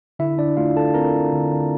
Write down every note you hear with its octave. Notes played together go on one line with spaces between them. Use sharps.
D3 E4 E5
D4 D5
A3 F4 F5
A4 A5
C4 A#4 A#5
D3